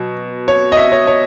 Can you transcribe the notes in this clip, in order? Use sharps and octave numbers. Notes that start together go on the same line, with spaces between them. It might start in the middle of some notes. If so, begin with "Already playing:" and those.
Already playing: B2 F#3
C#5
D#5
E5
C#5
C#5